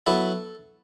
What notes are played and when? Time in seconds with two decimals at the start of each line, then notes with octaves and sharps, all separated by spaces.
0.06 F#3 B3 E4 A4